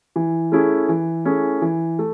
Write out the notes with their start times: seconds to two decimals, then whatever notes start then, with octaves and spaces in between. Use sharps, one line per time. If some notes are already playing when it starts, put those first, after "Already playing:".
0.16 E3
0.52 A3 C#4 E4 G#4
0.89 E3
1.25 A3 C#4 E4 G#4
1.62 E3
1.99 A3